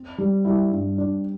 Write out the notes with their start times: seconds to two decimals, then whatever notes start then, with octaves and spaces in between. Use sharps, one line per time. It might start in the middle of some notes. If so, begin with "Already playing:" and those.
Already playing: C4
0.18 G3
0.45 G3 E4
0.71 G2
0.98 D4